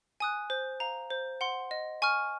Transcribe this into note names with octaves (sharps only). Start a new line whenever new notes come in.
G#5 D#6 F#6
C5
F5 A#5
C5
F#5 C6
D#5
G#5 C#6 F6